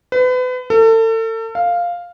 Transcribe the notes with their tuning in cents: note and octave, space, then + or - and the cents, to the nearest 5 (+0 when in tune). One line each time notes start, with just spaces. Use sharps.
B4 +35
A4 +35
F5 +0